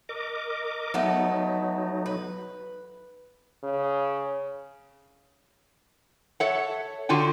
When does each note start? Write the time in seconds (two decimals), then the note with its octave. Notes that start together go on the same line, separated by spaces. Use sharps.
0.09 A#4 D#5 D6
0.94 F#3 A3 B3 D#4 D#5
2.06 B4
3.64 C#3
6.40 A4 C#5 E5 F#5
7.09 D3 F4 F#4 G5